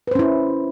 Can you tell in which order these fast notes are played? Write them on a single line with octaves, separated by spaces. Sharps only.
B4 C5 C#4 E4